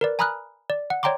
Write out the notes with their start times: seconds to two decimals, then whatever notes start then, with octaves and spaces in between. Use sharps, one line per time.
0.01 A#4 B4 D5
0.19 G#5 A#5 B5 D#6 F6 F#6
0.70 D5
0.90 F#5
1.03 C#5 D5 G5 A#5 C6 D6